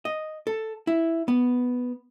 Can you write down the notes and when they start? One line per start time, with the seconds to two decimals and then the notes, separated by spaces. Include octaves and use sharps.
0.05 D#5
0.47 A4
0.87 E4
1.28 B3